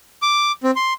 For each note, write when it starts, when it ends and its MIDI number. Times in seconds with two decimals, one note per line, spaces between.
0.22 0.52 86
0.63 0.71 60
0.76 0.93 84